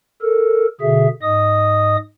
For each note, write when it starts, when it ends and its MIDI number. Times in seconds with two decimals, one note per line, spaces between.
0.22 0.67 69
0.22 0.67 70
0.81 1.08 47
0.81 1.08 50
0.81 1.08 68
0.81 1.08 76
1.22 1.96 44
1.22 1.96 75
1.22 1.96 87